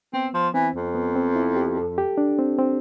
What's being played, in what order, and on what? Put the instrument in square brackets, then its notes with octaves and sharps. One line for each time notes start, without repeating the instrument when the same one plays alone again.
[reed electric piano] B3 [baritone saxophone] C4
[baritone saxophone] F3
[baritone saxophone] E3 [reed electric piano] C4
[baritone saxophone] F2
[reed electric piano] B3
C4
E4
G4
A4
G4
D4
C4
C4